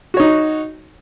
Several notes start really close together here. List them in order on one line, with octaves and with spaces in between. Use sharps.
F#4 C#5 D#4